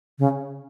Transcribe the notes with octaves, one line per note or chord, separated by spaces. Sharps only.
C#3